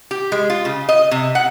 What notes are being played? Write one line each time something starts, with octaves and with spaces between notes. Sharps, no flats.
G4
G#3
F4
C#3
D#5
C3
F#5